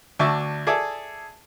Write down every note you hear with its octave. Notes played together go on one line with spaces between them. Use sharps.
D2 D4 E5 C#6
G#4 A4 D5 E5